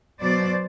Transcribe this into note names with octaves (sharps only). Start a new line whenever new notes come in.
B2 F#3 C5 D5